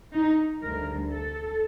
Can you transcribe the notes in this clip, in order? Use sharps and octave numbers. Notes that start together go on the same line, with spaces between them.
D#4
D2 D3 G3 A#4
A4